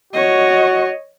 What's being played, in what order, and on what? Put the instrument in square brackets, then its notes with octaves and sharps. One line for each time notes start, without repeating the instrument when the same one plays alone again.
[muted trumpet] F#4 [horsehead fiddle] C#5 D#5